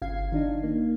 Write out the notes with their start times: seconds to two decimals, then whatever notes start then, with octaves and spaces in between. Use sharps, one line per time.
0.02 G1 C#3 F5 G#6 C7
0.32 D#3 D4 D#4
0.64 A#3